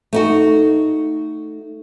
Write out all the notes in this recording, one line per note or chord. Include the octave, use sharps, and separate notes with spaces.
A3 D#4 F#4